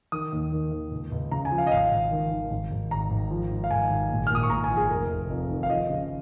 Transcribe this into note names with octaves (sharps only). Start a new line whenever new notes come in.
D#3 D#6
D#2
D#3
D#2
C#2
C#2
C#3 A#5
G#5
F3
F5
D#5
G#1 F5
G#1
D#3
D#3
G#1
G#1
G#1 A#5
G#1
F3
G#2
F5
G#1 G#5
G#1
A#1
F6
A#2 D#6
C#6
A#2 A#5
G#5
F3
G#4
F1 A#4
F1
F2
D#3
F5
F3 D#5
C#3